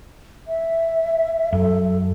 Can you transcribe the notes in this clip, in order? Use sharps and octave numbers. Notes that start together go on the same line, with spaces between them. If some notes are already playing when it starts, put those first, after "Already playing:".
E5
F#2 A4